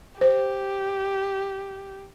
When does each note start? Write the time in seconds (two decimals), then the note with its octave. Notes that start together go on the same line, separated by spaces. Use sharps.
0.21 G4 C5